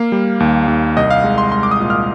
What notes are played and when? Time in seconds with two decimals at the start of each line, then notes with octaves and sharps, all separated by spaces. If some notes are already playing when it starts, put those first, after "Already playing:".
Already playing: A#3 F5
0.12 G3
0.40 D#2
0.68 D#2
0.97 C2 D#5
1.10 F5
1.24 G#3
1.38 C6
1.52 G#3 C6
1.63 D6
1.71 D#6
1.80 A#2
1.90 F6